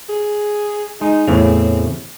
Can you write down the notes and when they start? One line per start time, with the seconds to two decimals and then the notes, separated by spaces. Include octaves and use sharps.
0.09 G#4
1.01 G#3 D#4
1.28 E2 A2 C#3 C4